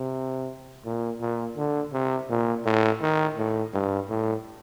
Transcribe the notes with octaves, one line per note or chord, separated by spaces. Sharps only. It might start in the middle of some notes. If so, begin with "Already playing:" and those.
Already playing: C3
A#2
A#2
D3
C3
A#2
A2
D#3
A2
G2
A2